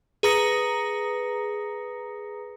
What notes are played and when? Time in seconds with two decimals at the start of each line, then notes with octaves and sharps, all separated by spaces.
0.23 G#4 B4 A#5 D#6 A#6 C#7